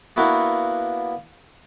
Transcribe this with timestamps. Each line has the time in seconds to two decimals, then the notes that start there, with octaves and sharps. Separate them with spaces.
0.16 A#3 B3 D4 E4 F#4